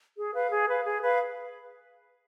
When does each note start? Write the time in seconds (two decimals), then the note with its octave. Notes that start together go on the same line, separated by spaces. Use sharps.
0.17 G#4
0.33 B4 F5
0.51 G#4
0.68 B4 F5
0.85 G#4
1.02 B4 F5